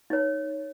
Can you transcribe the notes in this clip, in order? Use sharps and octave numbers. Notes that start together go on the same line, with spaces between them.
D#4 C#5